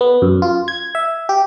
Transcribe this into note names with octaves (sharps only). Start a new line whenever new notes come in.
B3
F#2
F4
G#6
E5
G4